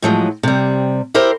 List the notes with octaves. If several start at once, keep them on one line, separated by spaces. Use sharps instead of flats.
A2 F3 F#3 G#3
C3 G3
E4 G4 A#4 C5